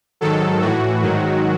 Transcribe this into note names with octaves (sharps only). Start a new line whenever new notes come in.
G#2 D#3 F#3 A4
A2 E3 F#4
G#2 D#3 F#3